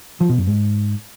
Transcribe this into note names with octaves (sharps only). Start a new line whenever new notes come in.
F3
B2
F#2
G#2